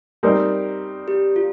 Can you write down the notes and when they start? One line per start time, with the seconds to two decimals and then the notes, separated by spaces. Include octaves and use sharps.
0.23 G3 C4 D#4 A#4
1.08 G4
1.36 F4